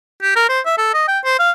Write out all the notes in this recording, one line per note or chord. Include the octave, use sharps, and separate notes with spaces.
G4
A#4
C5
E5
A4
D#5
G5
C5
F5